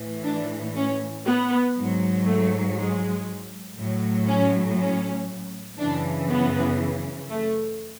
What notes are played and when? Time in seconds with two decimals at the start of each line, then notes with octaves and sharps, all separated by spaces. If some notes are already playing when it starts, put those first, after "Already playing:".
Already playing: A2 E3
0.23 D4
0.75 C#4
1.25 B3
1.75 G#2
1.80 F#3
2.25 A3
2.76 G#3
3.76 A2 F#3
4.27 C#4
4.78 C#4
5.79 F#2 C#3 E3 D4
6.28 B3
7.30 A3